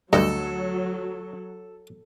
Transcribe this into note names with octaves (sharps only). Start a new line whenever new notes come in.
D2 G2 F#3 A4 D#5